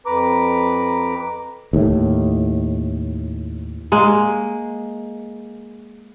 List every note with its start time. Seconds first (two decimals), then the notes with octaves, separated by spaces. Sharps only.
0.06 F2 B4 A#5 D6
1.73 D#2 A2
3.92 G#3 A#3